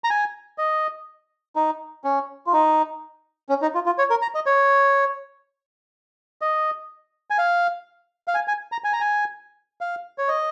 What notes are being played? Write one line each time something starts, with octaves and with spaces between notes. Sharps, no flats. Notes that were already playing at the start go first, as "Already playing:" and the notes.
A#5
G#5
D#5
D#4
C#4
F4
D#4
C#4
D#4
F4
F4
C#5
A#4
A#5
D#5
C#5
D#5
G#5
F5
F5
G#5
G#5
A#5
G#5
A#5
G#5
F5
C#5
D#5